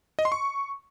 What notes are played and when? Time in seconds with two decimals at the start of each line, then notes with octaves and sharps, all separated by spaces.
0.19 D#5
0.25 C6
0.32 C#6